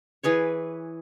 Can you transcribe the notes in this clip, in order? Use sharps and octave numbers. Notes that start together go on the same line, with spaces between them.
E3 G#4 B4 C#5